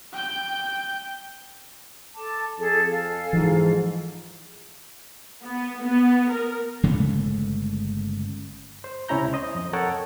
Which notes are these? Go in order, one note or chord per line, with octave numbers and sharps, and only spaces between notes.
G5 G6
A4 A5 D6
F2 G#4 A4
A4 F5 G#5
G#2 E3 F3
B3
B3
A#4
G1 C#3 G#3 A3
C5
C#2 C3 C#4 E4 A#5 G6
C5 D#5
F2 D#5
A4 A#4 C#5 F#5 G5 A5